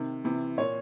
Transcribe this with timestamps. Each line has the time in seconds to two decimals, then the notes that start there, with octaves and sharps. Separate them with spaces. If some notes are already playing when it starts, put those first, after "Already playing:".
Already playing: C3 D#3
0.24 C3 E3
0.58 A#2 C#5